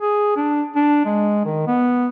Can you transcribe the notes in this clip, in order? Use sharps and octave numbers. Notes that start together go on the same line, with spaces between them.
G#4
D4
D4
G#3
D#3
B3